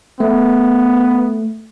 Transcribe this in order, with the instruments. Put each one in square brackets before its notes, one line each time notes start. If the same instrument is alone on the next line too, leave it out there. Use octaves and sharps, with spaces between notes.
[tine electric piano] A3 [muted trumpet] B3